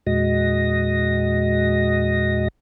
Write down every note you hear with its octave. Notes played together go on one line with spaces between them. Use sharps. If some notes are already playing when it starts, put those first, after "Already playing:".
E2 A#2 G#3 F#4 D#5 A#6